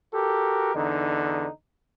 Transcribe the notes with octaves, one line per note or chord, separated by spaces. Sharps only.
F#4 G4 A4 A#4
E2 D3 D#4